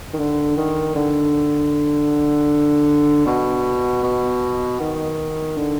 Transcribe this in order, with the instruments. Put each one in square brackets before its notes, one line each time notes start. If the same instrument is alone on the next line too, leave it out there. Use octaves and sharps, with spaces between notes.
[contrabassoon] D#3
D3
D#3
D3
B2
B2
D#3
D3